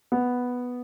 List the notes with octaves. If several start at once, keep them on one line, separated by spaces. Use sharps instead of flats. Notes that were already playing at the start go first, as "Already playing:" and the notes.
B3